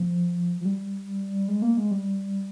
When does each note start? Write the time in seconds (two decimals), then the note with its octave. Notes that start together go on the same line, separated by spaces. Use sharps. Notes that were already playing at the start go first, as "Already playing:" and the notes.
Already playing: F3
0.61 F3
0.65 G3
1.48 G#3
1.62 A#3
1.77 G#3
1.91 G3